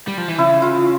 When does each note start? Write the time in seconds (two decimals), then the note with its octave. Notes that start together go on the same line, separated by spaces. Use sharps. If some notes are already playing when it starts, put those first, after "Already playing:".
0.08 G3
0.18 F3
0.28 E3
0.38 C#3 E4
0.62 F4